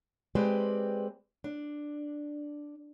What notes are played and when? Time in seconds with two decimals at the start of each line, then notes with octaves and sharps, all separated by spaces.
0.35 G#3 C4 G4 B4 D5
1.44 D4